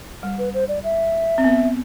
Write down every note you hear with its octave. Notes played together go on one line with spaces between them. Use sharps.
G3
B4
C5
D5
E5
C4
B3